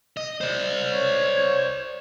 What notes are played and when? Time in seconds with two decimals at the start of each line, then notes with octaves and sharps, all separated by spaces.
0.17 D#5
0.41 C5 D5
0.88 C#5